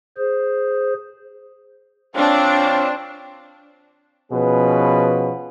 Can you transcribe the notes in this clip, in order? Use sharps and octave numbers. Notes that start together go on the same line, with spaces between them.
G#4 C5
C4 D4 F4 C#5 F5
B2 F3 C#4 G#4 B4